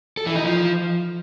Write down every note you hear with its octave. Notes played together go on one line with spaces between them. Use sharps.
A4
E3
D#4
F3